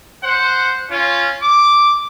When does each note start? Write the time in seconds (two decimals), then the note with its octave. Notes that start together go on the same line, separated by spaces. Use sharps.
0.24 C5 F#5
0.90 C#4 F4
1.43 D6